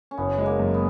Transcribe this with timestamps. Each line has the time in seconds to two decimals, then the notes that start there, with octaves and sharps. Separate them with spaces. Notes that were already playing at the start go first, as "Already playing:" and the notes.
0.11 C#4
0.18 F#1 B3
0.38 G#3
0.46 A#3
0.59 F#2
0.74 B3